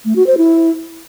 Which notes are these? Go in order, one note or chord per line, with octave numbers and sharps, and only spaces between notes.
A3
F#4
C5
E4